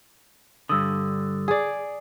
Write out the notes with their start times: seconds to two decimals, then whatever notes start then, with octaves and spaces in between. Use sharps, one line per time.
0.69 G2 D3 D#6 E6
1.48 G#4 D5